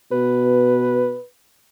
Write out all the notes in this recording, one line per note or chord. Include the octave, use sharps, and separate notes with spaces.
B2 B4